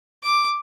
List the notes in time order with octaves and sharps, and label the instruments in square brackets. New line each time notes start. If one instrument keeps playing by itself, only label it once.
[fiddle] D6